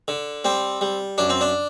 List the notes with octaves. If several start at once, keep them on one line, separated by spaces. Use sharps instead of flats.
D3
G3 C4
G3
F#2 D4
C4
D4